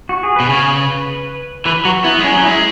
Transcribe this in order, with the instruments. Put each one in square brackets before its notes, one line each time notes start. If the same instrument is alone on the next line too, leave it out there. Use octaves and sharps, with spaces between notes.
[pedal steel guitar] F#4
G#4
[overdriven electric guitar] B2 [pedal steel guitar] B4
[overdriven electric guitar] C#3 [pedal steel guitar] C#5
[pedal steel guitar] B4
[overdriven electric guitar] E3 [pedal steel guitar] B4
[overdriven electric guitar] F#3 [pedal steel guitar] F#4
[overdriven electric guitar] B3 [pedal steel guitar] E4
[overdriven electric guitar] G#3
[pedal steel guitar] C#4
[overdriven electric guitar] F#3
[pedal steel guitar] C#4
[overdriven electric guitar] G#3 [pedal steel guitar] E4